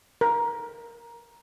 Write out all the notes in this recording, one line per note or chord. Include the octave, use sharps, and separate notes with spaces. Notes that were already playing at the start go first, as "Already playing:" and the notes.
A#4